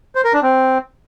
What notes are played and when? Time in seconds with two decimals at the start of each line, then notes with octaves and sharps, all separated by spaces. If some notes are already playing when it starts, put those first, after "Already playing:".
0.15 C5
0.24 A#4
0.33 D4
0.43 C4